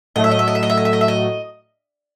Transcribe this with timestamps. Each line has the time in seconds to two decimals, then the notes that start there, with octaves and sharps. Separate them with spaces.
0.16 A2 F#3 A3 D#5
0.24 E5
0.31 D#5
0.39 E5
0.48 D#5
0.55 E5
0.63 D#5
0.70 E5
0.77 D#5
0.85 E5
0.93 D#5
1.01 E5
1.08 D#5